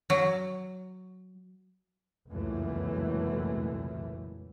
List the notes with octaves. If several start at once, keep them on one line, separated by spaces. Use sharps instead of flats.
F#3
F1 C#2 F#2 A#2 E3 A3